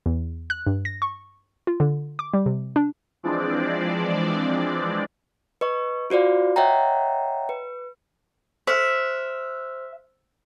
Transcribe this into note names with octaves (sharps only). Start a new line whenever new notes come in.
E2
F#6
G2
A#6
C#6
F4
D3
D6
G3
C3
D4
E3 F3 G#3 C4 D4 D5
B4 D#5 C#6
F4 F#4 C5 D5 F5
C#5 D#5 E5 F#5 G5 A#5
B4
C5 E5 F6